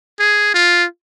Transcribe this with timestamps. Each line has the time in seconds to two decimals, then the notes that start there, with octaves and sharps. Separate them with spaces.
0.20 G#4
0.54 F4